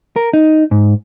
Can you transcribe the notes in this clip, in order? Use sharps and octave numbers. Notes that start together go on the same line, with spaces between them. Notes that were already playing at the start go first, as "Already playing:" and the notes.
A#4
D#4
G#2